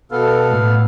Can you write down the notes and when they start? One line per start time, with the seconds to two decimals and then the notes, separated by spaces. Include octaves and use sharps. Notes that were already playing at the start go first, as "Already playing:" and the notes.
0.12 B2 B3 A4 F5
0.48 A2